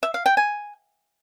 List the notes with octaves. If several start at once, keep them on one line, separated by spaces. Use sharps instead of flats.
E5
F5
G5
G#5